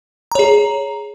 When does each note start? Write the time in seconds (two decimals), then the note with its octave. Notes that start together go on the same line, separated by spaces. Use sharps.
0.32 A#5
0.35 C#5
0.39 G#4